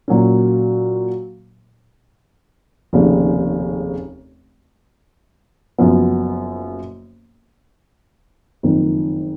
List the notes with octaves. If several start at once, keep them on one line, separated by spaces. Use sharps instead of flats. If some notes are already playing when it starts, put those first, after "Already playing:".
A#2 F#3 A#3 C#4
F1 D#2 C#3
F#1 F#2 F3 B3
F#1 F2 D#3